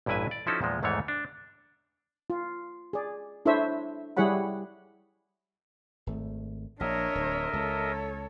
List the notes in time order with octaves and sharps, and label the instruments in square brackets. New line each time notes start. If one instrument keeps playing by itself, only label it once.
[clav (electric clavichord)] A1 G2 A#2 E4 B4 G#5
D5
F3 C#4 D#4 E4 F#4 A4
E2 A#2 F3 G#3
E2 G#2 D#3 E3 A3 C#5
D4
[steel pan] F4
G#4 D5
D4 E4 A4 C5 C#5 E5
G3 E4 G#4 C#5 F#5 B5
[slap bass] G#1 A3
[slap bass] A#1 [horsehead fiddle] D4 C#5 [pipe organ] A#4 D#5 E5
[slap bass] D1
[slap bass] C#2 [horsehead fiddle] A4 C#5